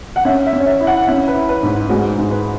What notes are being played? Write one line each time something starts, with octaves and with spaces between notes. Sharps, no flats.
F#5
C#4 E5
E5
C#4
C#5
E5
E4
F#5
C#4 E5
B4
E4
B4
G#2
G#3 F#4
G#2
B4